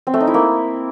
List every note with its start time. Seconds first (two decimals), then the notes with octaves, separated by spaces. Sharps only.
0.07 C4
0.14 A3
0.20 D#4
0.27 E4
0.34 A#3